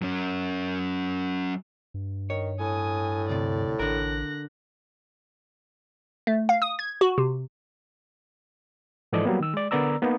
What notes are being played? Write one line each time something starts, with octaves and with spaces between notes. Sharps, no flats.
F#3 C#4
G2
D#3 C#5
A2 G#5 D#6
D2 C3 D5
A1 D3 A#4 F#6 A#6
A3
F5
D#6
G#6
F#4
C3
G#2 E3 F3 A4 D5 D#5
F#3 G3 A#3 B3
D#3 E6
G#3 D5
D3 B3 A#4 D5 A#5 E6
A#3 B3 D#4